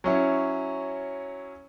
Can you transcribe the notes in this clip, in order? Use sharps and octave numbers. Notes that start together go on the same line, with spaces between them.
F#3 C#4 E4